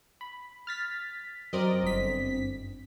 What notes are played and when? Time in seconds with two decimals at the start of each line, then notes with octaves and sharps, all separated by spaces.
0.21 B5
0.67 F6 A6 B6
1.53 F#2 C4 A#4 D5 D#5
1.82 G1 B6